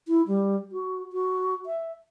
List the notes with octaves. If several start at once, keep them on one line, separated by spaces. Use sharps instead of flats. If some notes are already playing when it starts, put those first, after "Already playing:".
E4
G3
F#4
F#4
E5